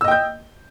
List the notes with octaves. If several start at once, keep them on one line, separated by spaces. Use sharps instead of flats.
D#5 G5 E6 G6